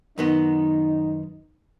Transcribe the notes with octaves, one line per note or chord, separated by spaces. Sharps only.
F#2 D#3 B3 D#4